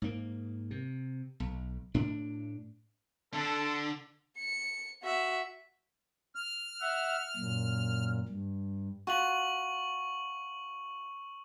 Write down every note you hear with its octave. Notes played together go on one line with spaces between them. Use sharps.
G#2 A#3
C3
B1
A2 D4
D3 A4
C#7
F#4 E5
F6
E5 F#5
F#2 A#2
G2
F4 F#4 C#6 F#7